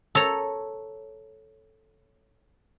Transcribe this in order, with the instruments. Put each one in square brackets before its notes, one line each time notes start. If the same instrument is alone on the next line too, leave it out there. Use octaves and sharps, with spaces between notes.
[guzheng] A4 C#5 A#5